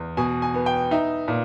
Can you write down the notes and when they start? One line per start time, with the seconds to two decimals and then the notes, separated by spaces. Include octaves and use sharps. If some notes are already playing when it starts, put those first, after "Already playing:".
Already playing: E2
0.17 B2 G#5
0.42 G#5
0.54 B3
0.66 G5
0.91 D#4 E5
1.28 A#2